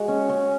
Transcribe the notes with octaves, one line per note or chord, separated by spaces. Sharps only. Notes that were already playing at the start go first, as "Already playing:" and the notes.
Already playing: G#3 F#4
C#4
C#4